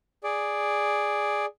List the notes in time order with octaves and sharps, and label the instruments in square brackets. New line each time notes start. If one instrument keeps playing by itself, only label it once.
[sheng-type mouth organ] G#4 D5